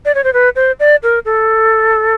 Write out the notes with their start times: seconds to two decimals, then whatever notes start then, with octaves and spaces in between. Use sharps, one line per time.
0.05 D5
0.15 C#5
0.24 C5
0.33 B4
0.56 C5
0.80 D5
1.03 A#4
1.25 A4